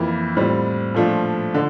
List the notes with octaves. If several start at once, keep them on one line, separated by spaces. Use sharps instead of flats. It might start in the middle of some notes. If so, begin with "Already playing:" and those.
Already playing: F2 E3 A#3 E4
A2 G3 C4 F4
A#2 F3 A3 D4
D3